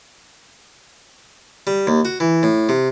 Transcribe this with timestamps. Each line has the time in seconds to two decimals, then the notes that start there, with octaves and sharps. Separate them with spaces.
1.67 G3
1.87 D#2
2.05 F#4
2.20 E3
2.43 A2
2.69 C3